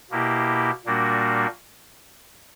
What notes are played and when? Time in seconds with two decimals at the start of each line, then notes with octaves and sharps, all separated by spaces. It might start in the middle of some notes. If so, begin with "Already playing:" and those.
0.11 B2 A#3 E4 G4
0.85 A#2 G3 A#3 D4 F#4